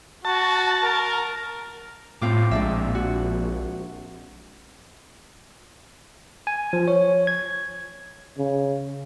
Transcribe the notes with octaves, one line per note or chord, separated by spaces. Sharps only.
F#4 A5
A#4
A2 C4 F4 D6
A#1 G#3 D4 E5
F#4
G#5
F3
C#5
G#6
C#3